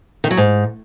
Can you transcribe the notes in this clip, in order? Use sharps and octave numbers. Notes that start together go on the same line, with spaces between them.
D#3
F#3
G#2